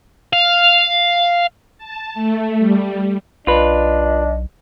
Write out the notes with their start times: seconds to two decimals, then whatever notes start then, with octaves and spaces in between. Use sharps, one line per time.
0.33 F5
1.78 A5
2.14 A3
2.59 G3
3.47 B1 D4 F4 B4 D#5